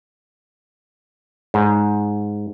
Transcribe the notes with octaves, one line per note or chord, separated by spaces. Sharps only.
G#2